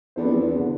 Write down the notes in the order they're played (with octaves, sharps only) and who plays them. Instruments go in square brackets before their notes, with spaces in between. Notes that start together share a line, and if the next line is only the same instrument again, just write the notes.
[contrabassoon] E2 [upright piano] B3 D4 A4 C5
[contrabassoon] F2
E2
[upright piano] D3